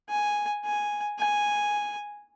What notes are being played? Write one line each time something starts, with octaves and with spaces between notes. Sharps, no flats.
G#5
G#5
G#5